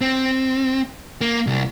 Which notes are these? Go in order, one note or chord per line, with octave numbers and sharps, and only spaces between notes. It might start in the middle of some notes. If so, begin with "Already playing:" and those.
C4
A#3
C2